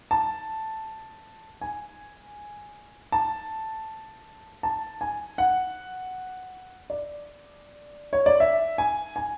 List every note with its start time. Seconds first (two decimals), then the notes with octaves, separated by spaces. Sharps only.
0.11 A5
1.61 G#5
3.12 A5
4.63 A5
5.01 G#5
5.38 F#5
6.90 D5
8.13 C#5
8.26 D5
8.40 E5
8.78 G#5
9.16 G#5